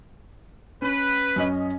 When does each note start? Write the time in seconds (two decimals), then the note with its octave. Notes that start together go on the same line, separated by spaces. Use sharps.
0.82 C#4 B4
1.36 F#2 C#4 D#5